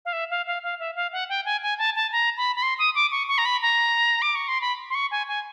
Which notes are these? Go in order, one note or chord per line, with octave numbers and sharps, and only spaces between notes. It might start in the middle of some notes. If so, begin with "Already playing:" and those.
F5
E5
F5
F5
F5
E5
F5
F#5
G5
G#5
G#5
A5
A5
A#5
B5
B5
C6
D#6
D6
C#6
C#6
A#5
B5
A#5
D6
C#6
C6
B5
C6
C#6
G#5
G#5